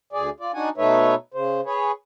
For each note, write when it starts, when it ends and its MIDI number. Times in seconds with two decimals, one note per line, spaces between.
0.13 0.30 38
0.13 0.30 68
0.13 0.30 74
0.40 0.52 65
0.40 0.52 74
0.54 0.69 62
0.54 0.69 63
0.54 0.69 66
0.54 0.69 78
0.54 0.69 80
0.77 1.15 47
0.77 1.15 57
0.77 1.15 63
0.77 1.15 71
0.77 1.15 73
0.77 1.15 76
1.34 1.61 49
1.34 1.61 72
1.66 1.92 68
1.66 1.92 71
1.66 1.92 73